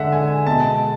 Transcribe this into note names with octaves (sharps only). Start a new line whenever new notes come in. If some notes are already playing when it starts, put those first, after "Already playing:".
Already playing: D3 G#3 E5 F#5
G#5
G#5
B2 G#3 A5